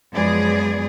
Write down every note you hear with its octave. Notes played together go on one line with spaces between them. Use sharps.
F#2 F3 G#3 B3 G#4 D5